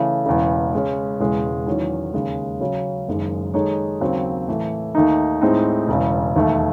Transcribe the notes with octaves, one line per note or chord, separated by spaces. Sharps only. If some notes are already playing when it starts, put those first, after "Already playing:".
Already playing: C#3 E3 A3
E1 E2 C#3
C#3 G#3 C#4
E1 E2 C#3 G#3
E2 D#3 F#3 C#4
D#2 C#3 G#3
C#3 F#3 C#4
F#1 F#2 D#3 G#3
D#3 G#3 D#4 A4 C#5
D#2 C#3 F#3 C4
A2 E3 A3
D#2 D#3 A3 D#4
A2 G#3 C4 D#4
E1 E2 C#3
E1 D#2 D#3 A3